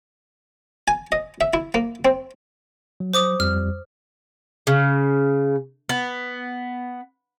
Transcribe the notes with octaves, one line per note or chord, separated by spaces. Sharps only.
G#5
D#5
E5
E4
A#3
C4
F#3
C5 D6 D#6
F2 G3 F6
C#3
B3